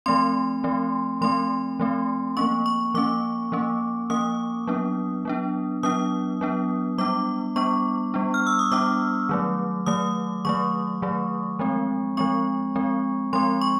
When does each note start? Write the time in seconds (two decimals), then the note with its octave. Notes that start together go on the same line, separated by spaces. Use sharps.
0.06 F3 A3 C4 C6
0.64 F3 A3 C4
1.21 F3 A3 C4 C6
1.79 F3 A3 C4
2.37 F3 A#3 C#4 C#6
2.66 C#6
2.94 F3 A#3 C#4 D6
3.52 F3 A#3 C#4
4.10 F3 A#3 C#4 D#6
4.67 F#3 B3 D4
5.25 F#3 B3 D4
5.83 F#3 B3 D4 D#6
6.41 F#3 B3 D4
6.98 G3 B3 D4 D6
7.56 G3 B3 D4 C#6
8.14 G3 B3 D4
8.34 F6
8.47 E6
8.59 D#6
8.71 G3 B3 D4 D6
9.29 D#3 F#3 A3
9.86 D#3 F#3 A3 D#6
10.45 D#3 F#3 A3 C#6
11.02 D#3 F#3 A3
11.59 F3 G#3 C4
12.17 F3 G#3 C4 C#6
12.75 F3 G#3 C4
13.33 F3 G#3 C4 C6
13.61 C#6